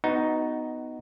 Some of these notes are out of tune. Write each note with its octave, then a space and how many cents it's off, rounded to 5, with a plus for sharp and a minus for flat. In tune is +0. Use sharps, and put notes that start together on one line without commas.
B3 +15 D#4 +0 F#4 +0